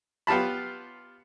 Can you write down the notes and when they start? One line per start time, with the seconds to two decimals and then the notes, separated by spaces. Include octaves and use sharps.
0.27 B3 F4 G4 A5 B5